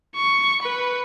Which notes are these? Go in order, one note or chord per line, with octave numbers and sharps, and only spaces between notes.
C#6
B4